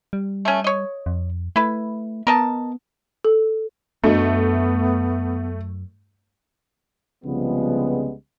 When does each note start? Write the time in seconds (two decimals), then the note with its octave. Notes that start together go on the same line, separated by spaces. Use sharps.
0.13 G3
0.45 A3 C#4
0.64 C#5 D#5
1.06 F2
1.56 A3 E4 B4
2.27 B3 A#4 D#5 A5
3.25 A4
4.04 F#2 A3 B3 D4 F#4 D#5
7.24 C2 C#3 F3 G3 G#3 B3